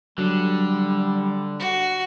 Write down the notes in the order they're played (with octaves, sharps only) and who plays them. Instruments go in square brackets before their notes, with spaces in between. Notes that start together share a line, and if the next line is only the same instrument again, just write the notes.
[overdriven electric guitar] D3 [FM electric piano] F#3 [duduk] G3
[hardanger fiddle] F#4